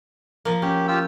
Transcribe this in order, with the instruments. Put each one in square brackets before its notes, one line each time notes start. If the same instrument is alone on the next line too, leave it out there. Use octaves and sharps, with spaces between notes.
[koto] F3 A#3
[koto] C#4 [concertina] G4
[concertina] F4 G4 E6